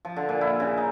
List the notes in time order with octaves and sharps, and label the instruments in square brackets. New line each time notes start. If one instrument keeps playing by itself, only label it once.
[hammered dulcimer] F3
D3
A#2
E4
C#3
D#4